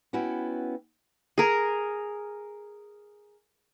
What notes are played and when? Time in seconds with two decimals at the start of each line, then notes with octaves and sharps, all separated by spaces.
0.13 B3 C#4 E4 F#4 G5
1.38 G#4 A#4